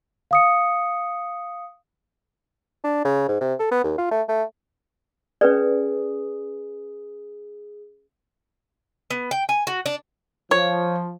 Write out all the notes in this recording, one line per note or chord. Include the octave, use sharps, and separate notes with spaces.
F5 D#6 C#7
D4
C#3
G#2
C3
A4
B3
D#2
F4
A3
A3
C#4 G#4 B4 D5
B3
G5
G#5
F#4
D4
F3 C#5